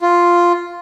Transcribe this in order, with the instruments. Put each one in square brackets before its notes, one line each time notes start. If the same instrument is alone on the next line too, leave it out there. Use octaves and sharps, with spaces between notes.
[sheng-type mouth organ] F4